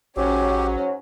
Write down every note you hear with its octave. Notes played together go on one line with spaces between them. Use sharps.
A1 G#2 F#3 C#4 G4